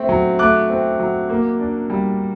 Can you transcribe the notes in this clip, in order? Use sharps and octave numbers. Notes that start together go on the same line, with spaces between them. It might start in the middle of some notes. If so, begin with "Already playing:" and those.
Already playing: A3 C4
F#3
A3 D6 F#6
C4
F#3
A#3
D4
G3